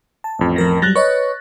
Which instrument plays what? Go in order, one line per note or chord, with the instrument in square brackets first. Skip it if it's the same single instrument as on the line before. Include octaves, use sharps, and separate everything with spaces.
[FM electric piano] A5
[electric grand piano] A1 F2
[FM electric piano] F3 A#4 A#6
[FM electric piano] F#3 G3 [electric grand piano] F#6 A6 A#6
[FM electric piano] B4 C#5 D#5 [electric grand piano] C#6